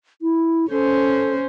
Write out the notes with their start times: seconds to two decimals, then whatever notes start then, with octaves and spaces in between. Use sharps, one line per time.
0.22 E4
0.71 C#4 A4 C5